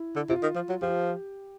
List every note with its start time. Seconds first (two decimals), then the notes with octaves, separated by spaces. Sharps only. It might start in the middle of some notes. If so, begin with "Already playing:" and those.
Already playing: E4
0.16 D3
0.29 C3 F4
0.43 D#3
0.55 F3
0.69 F#3
0.82 F3 G4